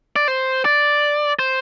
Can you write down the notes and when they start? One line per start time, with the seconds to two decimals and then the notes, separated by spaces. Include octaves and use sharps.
0.16 D5
0.28 C5
0.65 D5
1.39 C5